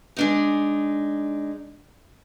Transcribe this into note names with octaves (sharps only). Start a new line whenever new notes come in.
G#3 D4 D#4